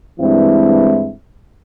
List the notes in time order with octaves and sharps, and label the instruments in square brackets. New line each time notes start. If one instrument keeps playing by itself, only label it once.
[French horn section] G2 E3 G#3 C4 E4